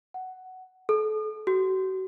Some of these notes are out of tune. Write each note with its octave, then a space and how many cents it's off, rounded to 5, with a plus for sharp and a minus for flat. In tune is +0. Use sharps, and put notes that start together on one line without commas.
F#5 +10
A4 -35
F#4 +40